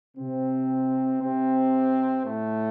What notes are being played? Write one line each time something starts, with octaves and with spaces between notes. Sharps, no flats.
C3 C4
C3 C4
A2 A3